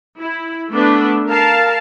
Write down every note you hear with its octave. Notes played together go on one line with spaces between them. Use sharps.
E4
A3 B3 D4 B4
A#4 F5 A5